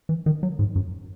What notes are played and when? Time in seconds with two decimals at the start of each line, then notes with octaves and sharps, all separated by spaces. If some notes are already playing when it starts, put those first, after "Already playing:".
0.09 E3
0.26 D#3
0.43 F#3
0.59 G#2
0.76 F#2